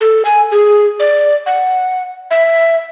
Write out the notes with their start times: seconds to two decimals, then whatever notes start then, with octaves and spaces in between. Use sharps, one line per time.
0.01 A4
0.25 G#5
0.51 G#4
1.00 D5
1.46 F#5
2.31 E5